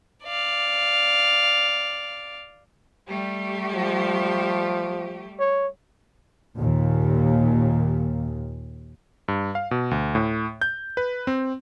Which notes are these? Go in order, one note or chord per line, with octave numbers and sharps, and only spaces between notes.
D5 F5
G3 A3 G4
F3
C#5
D#2 A#2
G2
F5
B2
D2
A2
G6
B4
C4